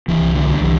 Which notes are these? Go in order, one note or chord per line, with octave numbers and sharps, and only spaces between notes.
C2 E3
D3
C2
E3